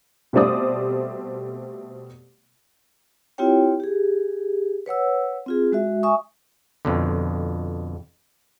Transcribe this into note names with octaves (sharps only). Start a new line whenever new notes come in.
B2 G3 A3 C4 D5 D#6
C4 E4 F4 G4 C#5 G5
G4 G#4
B4 C#5 F#5 E6
C4 F4 G#4
G#3 F#4 E5
E5 G#5 C#6 D#6
F2 B2 D3